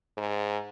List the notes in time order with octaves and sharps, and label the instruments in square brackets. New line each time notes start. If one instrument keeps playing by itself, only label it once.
[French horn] G#2